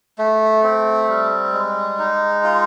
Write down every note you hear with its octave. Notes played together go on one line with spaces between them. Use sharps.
A3
C4
G3
G#3
D#4
F4